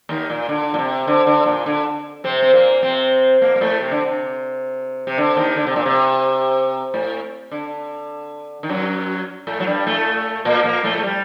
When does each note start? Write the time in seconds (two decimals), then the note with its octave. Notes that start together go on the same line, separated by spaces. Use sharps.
0.09 D#2 D#3
0.30 A#2
0.49 D3
0.74 A#2
0.79 C3
1.07 D3
1.27 D3
1.46 A#2
1.66 D3
2.24 C3 C4
2.42 C4
2.53 A#2 A#3
2.83 C3 C4
3.41 A#2 A#3
3.56 A#3
3.61 A2 A3
3.81 C3
3.91 D3
4.01 C3
5.07 C3
5.18 D3
5.37 D#2 D#3
5.56 D3
5.67 C3
5.76 A#2
5.86 C3
6.94 A2
7.51 D3
8.63 D#3
8.69 F#2 F#3
9.47 A2 A3
9.60 F#3
9.66 G2 G3
9.87 A2 A3
10.45 A#2 A#3
10.64 A#2 A#3
10.84 A2 A3
10.98 A3
11.03 G3